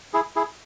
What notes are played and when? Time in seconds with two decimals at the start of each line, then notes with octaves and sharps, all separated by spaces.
0.14 E4 G#4
0.36 E4 G#4